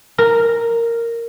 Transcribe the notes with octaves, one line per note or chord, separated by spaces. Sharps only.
A#4